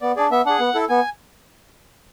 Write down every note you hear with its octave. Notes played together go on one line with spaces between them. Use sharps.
B3 D5
D4 G#4 D5
B3 E5
D4 G#4 F#5
B3
E4 A4
B3 G#5